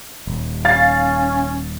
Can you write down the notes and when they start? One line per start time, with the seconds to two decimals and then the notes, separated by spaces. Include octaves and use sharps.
0.27 D#1
0.65 C#4 F5 A6